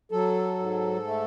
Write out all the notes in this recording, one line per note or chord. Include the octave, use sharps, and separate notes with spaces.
F#3 A4
G#2
A3